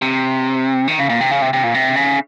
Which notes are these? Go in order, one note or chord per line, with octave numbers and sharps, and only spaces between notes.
C3
D#3
C#3
A#2
C3
C#3
C3
C3
A#2
C3
C#3